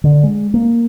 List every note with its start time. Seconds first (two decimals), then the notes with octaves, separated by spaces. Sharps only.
0.04 D3
0.23 G#3
0.54 A#3